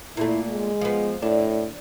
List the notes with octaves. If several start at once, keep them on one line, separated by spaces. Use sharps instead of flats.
A#2 A3 E4
G#3
F3 B3
A2 D4